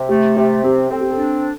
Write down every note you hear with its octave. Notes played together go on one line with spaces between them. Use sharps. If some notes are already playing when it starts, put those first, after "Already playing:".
Already playing: C3
A3 G4
C3 G4
C4 G4
C4 A4
G4
A4
D4